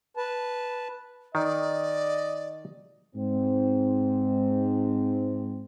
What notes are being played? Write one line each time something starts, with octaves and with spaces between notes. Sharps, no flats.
B4 A5
D#3 D5 D#5
G#2 C4